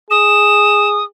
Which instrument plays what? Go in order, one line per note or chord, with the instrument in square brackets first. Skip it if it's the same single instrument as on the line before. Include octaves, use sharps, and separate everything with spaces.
[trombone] G#4 [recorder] D#6 [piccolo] E7